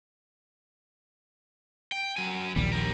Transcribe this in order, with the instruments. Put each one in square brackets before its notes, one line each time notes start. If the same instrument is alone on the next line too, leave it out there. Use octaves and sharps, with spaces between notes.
[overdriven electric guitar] G5
F#3 G#5
[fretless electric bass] A#1 D#2 [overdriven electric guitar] G3
[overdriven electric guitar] G4 A#4